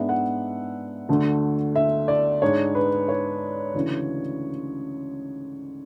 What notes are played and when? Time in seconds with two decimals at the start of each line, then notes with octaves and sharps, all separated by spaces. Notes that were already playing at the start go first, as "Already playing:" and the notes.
Already playing: G#2 G#3 B3 D4 E5
0.09 F#5
1.09 D2 D3 A3
1.76 E5
2.08 D5
2.42 G#2 G#3 D4 C#5
2.75 B4
3.09 C#5
3.74 D2 C#3 E3